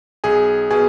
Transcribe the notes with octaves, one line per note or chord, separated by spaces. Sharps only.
B1 G#4 G#5
B2 G#4 G#5